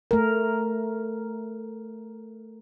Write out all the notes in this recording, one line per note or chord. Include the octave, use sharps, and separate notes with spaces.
A3 A#4